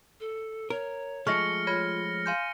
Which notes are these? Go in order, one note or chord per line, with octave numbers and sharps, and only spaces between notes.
A4
A#4 C#5
F3 G#3 A3 C#6 F6 A#6 C#7
F4 C#5 B5 G#6 A#6
F5 G#5 C6 G6